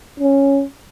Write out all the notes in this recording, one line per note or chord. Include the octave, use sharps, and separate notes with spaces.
C#4